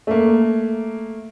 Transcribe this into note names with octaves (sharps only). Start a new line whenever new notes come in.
A3 A#3